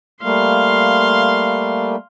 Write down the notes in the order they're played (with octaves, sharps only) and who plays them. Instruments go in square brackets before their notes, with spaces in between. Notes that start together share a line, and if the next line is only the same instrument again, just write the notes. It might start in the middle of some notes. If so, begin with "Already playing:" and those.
[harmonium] G3 A3 A#3 [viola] F5 C6